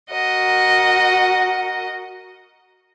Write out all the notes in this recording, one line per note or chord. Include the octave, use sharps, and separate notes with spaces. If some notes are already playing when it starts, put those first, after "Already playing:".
F#4 A#4 D#5 F#5